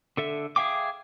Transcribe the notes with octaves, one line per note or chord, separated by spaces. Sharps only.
D3 A4 E5
G#4 E5 F5 G5 D6